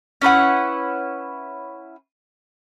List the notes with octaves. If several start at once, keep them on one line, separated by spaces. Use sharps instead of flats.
C#4 E4 B4 F#5